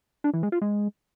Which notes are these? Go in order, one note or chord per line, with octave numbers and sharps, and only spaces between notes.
D4
E3
G#3
F4
G#3